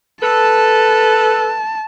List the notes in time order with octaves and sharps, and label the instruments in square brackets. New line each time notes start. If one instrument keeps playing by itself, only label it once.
[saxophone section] A4 B4 [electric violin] A5